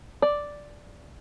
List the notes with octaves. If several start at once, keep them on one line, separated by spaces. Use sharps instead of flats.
D5